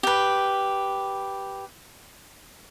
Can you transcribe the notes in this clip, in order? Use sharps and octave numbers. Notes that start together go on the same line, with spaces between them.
G4 B4